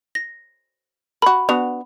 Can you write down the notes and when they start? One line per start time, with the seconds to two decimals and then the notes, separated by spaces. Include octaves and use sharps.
0.15 A#6
1.22 F#4 A#4 B5
1.49 B3 D4 F#4 F7